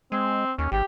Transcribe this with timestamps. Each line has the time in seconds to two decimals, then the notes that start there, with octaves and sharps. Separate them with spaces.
0.12 G#3 C4
0.58 D#2 C#4
0.72 G#1 G4